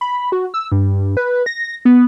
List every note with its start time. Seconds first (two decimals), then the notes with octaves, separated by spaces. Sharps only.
0.01 B5
0.32 F#4
0.54 E6
0.72 G2
1.17 B4
1.46 A#6
1.85 B3